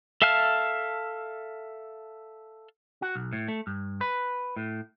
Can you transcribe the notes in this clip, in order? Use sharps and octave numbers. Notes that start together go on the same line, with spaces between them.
A4 E5 F5 A5 F6
F#4
B1
A2
A3
G2
B4
A2